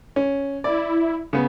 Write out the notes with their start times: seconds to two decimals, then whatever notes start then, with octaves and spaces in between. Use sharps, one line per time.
0.16 C#4
0.64 E4 D5
1.33 C#3 B3